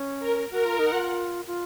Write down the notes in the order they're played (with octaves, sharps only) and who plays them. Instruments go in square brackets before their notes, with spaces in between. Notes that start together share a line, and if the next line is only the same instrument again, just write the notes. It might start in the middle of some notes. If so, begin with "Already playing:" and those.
Already playing: [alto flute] C#4
[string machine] A#4
[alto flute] F#4 [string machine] A#4
[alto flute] F4
[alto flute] D#4 [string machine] F#5
[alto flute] F4
F4